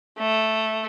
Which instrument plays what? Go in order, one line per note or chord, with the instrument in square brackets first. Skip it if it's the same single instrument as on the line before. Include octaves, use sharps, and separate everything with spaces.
[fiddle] A3